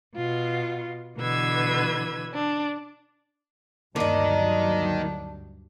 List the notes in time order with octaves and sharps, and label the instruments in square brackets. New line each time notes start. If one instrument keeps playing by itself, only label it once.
[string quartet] B2 F4
B2 D3 E3 B4 E6 G#6
D4
[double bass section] D2 G2 F#3 [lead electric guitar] D#3 D#4 [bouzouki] A#3 D5 [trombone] D4